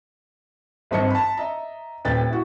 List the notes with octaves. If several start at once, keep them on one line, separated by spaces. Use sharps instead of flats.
G#1 G2 C4 D#5 A5 C#7
A5 B5
D#5 E5 A#5
D#1 B4 G5 A6
E4 F#4